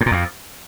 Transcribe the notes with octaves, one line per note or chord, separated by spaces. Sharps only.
A2
A#2
F2